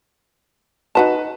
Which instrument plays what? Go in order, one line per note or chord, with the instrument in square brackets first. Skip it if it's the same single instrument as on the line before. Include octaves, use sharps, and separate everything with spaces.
[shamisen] D#4 F#4 A5 [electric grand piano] B4 E7